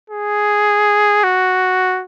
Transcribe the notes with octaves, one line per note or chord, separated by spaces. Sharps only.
G#4
F#4